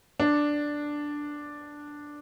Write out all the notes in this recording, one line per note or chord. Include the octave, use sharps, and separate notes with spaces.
D4